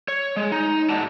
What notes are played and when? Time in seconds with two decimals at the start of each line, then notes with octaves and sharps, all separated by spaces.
0.08 C#5
0.37 G#3
0.52 D#4
0.89 G#2 F#4 D5 A5